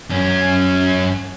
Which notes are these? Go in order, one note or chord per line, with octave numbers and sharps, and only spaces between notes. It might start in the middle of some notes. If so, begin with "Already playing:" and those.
F#2 C#4